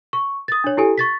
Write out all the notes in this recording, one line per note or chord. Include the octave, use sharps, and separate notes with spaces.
C#6
D#6 A6
D4 C#5
E4 G4 A4 G#5
C#6 A6 B6